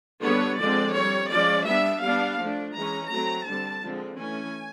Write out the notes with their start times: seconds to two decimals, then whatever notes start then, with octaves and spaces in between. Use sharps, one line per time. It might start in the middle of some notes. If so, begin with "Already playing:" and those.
0.23 D3 G3 B3 D4 C#5
0.59 D3 F3 G#3 C4 D5
0.95 G3 C4 C#5
1.31 F3 G#3 C#4 D5
1.66 G3 B3 D4 E5
2.02 G3 B3 D4 F5
2.39 F3 A3 D4
2.75 E3 G#3 C#4 A#5
3.10 F#3 A3 C4 A#5
3.46 D3 G3 C4 A5
3.83 D3 F3 G#3 C4
4.18 E3 A3 C#4 G#5